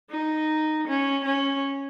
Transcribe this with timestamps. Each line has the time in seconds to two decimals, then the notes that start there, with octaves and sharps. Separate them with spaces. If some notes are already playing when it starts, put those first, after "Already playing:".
0.11 D#4
0.88 C#4
1.25 C#4